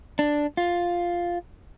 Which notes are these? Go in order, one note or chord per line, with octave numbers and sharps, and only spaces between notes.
D4
F4